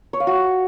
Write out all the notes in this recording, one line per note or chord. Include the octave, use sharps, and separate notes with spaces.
C#5
F5
F#4